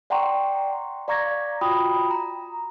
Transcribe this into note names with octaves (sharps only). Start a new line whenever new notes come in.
D5 F#5 G5 A#5 C6 C#6
D5 F5 A#5 C#6 G#6 A#6
F4 F#4 G5 A#5 B5 D#6
A#5